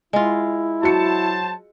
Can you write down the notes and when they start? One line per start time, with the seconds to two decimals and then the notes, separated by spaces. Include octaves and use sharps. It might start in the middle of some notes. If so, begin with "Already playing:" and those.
0.13 G#3 E4 F4
0.83 F#3 F#4 C5 A5 C#7